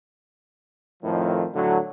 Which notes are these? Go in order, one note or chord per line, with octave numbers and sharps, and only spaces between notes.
F2 A2 D#3 F3
A2 D3 F#3